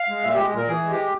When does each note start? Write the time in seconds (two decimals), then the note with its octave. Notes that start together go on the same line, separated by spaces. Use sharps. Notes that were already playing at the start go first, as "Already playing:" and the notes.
Already playing: F5
0.09 G#3
0.23 A#2 E5
0.35 G#3 G4
0.53 A#2 A#4
0.68 E3 G#4
0.83 G#3
0.90 G4